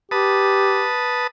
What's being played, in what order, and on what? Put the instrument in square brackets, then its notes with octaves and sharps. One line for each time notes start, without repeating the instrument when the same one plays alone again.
[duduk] G4 [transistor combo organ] B4 A5 D#6